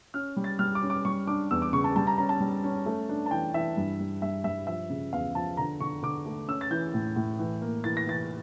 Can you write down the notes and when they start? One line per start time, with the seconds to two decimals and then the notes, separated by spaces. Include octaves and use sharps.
0.14 C#4 F6
0.36 G3
0.44 A6
0.59 G3 F6
0.75 D6
0.82 C#4
0.90 D6
1.05 G3 C#6
1.27 D4 D6
1.51 E2 E6
1.62 D6
1.73 C#3 C#6
1.84 A5
1.96 G3 A5
2.07 A#5
2.18 C#4 A#5
2.29 A5
2.40 G3
2.64 C#4
2.86 A3
3.09 D4
3.26 A5
3.31 E3 G5
3.54 E3 E5
3.77 G2
3.99 G2
4.22 G2 E5
4.44 G2 E5
4.67 F3 E5
4.90 C#3
5.13 E2 F5
5.35 F3 A5
5.57 D3 A#5
5.80 D3 C#6
6.03 D3 D6
6.26 A3
6.48 C#4 E6
6.61 A6
6.71 E3 G6
6.94 A2
7.16 A2
7.39 E3
7.61 A#3
7.84 E3 A6
7.97 A#6
8.07 E3 A6